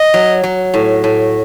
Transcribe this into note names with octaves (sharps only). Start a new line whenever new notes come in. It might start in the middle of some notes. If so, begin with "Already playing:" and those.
Already playing: D#5
F#3
F#3
A2
A2